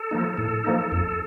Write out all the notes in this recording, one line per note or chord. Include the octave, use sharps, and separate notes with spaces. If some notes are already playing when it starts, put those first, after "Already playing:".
Already playing: A4
F3 A#3 D#4
A2 A4
F3 A#3 D#4
F2 A4